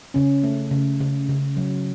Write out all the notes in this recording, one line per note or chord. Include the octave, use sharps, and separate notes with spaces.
C#3 C#4
A3
C#3
C#3
C#3
F#3